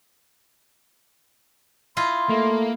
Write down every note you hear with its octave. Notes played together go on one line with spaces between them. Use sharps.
E4 F4 D#5 C6
A3 A#3